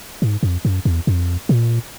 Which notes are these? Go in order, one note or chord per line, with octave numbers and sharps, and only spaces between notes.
G#2
F2
F#2
E2
F2
A#2